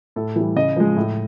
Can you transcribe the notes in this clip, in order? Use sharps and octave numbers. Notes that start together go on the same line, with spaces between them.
A2 A4
E3 G3
C#3 D#5
F3 G#3
A2